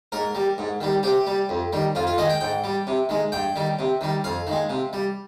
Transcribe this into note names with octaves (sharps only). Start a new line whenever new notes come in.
G#2 A#4
G3
G#2
D#3 G3
C3 G4
G3
F2
D#3 G3
F2 F4
F4
D#3 G#3 D#5
G5
G#2 G5
G3
C3
D#3 G#3
G2 G5
D#3 G3
C3
D#3 G3
F2 F5
D#3 G#3
C3
G3